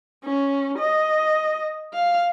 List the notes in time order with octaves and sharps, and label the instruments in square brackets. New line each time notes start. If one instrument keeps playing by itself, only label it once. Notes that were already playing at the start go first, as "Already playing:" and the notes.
[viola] C#4
D#5
F5